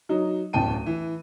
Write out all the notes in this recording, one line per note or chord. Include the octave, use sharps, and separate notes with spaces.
F#3 D#4
D1 A1 E2 G5 A5 D#7
E3